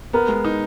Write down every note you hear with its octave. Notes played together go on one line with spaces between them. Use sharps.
B3 A#4
G#3
D#4